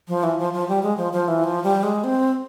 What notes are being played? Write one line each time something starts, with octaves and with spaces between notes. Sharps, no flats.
F3
E3
F3
F3
G3
G#3
F3
F3
E3
F3
G3
G#3
C4